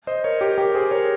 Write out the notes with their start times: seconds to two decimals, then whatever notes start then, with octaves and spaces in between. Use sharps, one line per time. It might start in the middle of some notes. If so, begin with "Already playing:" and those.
0.07 C5 D#5
0.24 A#4 C#5
0.41 G4 A#4
0.58 G4 A#4
0.75 G#4 C5
0.91 A#4 C#5